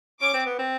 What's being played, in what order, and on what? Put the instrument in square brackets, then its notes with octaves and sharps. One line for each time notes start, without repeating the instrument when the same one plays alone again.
[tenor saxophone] C#4 [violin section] D6
[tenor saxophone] C4
B3
C4